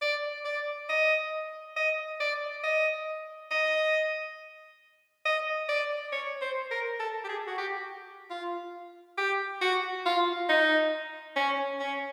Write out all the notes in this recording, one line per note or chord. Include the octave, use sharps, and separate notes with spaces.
D5
D5
D#5
D#5
D5
D#5
D#5
D#5
D5
C#5
C5
A#4
A4
G4
G#4
F#4
G4
F4
G4
F#4
F4
D#4
C#4
C#4